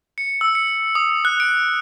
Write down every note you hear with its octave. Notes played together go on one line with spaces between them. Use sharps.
C#7
E6
C#7
D#6
F#6
D7